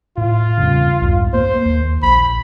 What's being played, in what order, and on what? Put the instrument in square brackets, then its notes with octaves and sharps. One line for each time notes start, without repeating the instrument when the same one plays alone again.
[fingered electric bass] A2 [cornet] F4
[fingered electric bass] E2 G2 C#3
C2 F2 G#2
[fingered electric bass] A#3 [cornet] C5
[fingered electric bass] D#2
[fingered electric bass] A#1 [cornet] B5